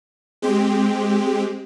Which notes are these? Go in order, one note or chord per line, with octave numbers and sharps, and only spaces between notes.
G#3 C4 G4